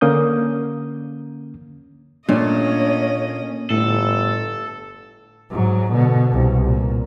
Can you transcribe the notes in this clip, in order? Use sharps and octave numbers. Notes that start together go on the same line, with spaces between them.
D3 A#3 C#4 D#6 G6
A#2 A3 A#3 C#4 D4 C#5 D#5
G1 A2 A4
G#2 F#3
B2 D3
C2
A#2